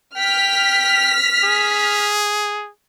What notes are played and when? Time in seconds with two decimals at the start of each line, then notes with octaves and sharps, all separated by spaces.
0.17 G5 F6 B6
1.44 G#4